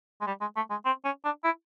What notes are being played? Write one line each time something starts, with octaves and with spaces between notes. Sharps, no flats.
G#3
G3
G#3
A3
G#3
C4
C#4
D4
E4